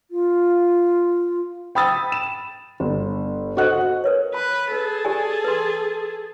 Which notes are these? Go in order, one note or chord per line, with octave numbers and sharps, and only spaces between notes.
F4
G5 B5 D#6 E6 A6
E7
G1
F#4 A4 C5 D#5 F#5 F#6
A#4 B4 C#5
B4 B5
G#4 A4 B4
G4 D5 G#5
B4 C6